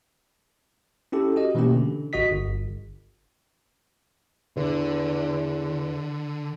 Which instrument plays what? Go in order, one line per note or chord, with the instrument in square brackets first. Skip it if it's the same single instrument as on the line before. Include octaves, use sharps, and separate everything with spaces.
[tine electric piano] C#4 E4 G4 A4
F#4 G4 D#5
B2 E3 A3 A#3 C#4 G4
D3
A1 F#4 D#5 B6
G1
[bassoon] E2 [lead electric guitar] D3